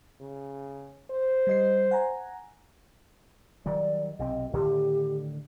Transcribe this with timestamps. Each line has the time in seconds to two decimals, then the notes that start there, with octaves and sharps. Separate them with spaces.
0.21 C#3
1.11 C5
1.47 G3 D#5 C7
1.91 F#5 G#5 A#5
3.66 D#3 F#3 G3 D5
4.19 B1 C3 C4 D#5
4.54 A2 D3 D#3 G4